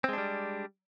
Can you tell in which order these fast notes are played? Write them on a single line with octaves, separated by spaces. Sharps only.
C4 G#3 D4 G3